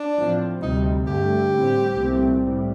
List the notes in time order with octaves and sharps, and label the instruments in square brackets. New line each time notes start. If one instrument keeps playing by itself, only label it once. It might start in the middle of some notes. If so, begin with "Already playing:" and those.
Already playing: [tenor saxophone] D4
[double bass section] A2 F3 C4
[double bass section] D2 C3 G3 C4 [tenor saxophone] D#4
[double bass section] G2 D3 A3 [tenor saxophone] G4
[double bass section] A2 G3 C4
C2 A#2 A3 C4
A2 G3